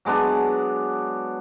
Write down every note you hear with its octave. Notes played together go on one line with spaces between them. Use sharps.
F#3 G#3 B3 D4